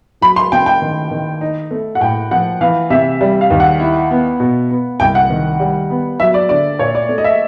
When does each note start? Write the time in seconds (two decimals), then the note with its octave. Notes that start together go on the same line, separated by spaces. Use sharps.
0.21 F#3 B5
0.36 C6
0.52 C#3 G5
0.66 G5
0.82 D#3
1.11 D#3
1.41 D#4
1.71 A3
1.95 F#5
2.01 A2 G5
2.31 F3 F#5
2.61 E3 F5
2.90 C3 E5
3.21 G3 E5
3.41 F5
3.50 D#2
3.60 F#5
3.80 E4
4.11 B3
4.40 B2
4.71 B3
5.00 C2 G5
5.15 F#5
5.30 D#3
5.60 G3
5.90 B3
6.20 F#3 E5
6.34 D5
6.49 D3 D5
6.79 A#2 C#5
6.95 D5
7.09 A3
7.18 D#5
7.24 E5